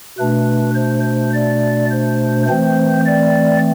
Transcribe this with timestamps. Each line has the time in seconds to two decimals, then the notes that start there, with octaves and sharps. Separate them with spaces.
0.18 B2 A3 D4 B4
0.75 C5
1.04 C5
1.33 D5
1.91 C5
2.48 E3 A3 C4 C5
3.06 D5